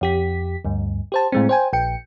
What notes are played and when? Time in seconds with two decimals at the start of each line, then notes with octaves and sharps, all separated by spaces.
0.01 F2 G4 B6
0.65 D2 G2
1.12 G4 C5 A5
1.32 A2 G#3 C4
1.49 C5 G5 G#5
1.73 A#1 G5 C#7